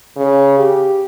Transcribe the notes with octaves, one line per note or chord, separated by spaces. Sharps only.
C#3
G4